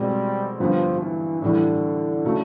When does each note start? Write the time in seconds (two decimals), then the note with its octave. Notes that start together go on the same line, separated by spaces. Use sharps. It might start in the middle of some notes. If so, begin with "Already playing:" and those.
Already playing: B2 G3 G#3 C4
0.60 G2 D3 F3 G3 B3
1.01 E3
1.42 A2 D3 E3 G3
2.25 C#3 F#3 A3